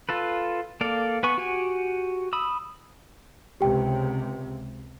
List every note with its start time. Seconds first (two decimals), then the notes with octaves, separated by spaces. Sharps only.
0.09 F4 A4 B4
0.81 A#3 A4 D5 F5
1.23 B3 B4 G#5 C#6
1.38 F#4 G4 F#5 G#5
2.33 B5 D#6 E6
3.61 C#2 C3 G4 G5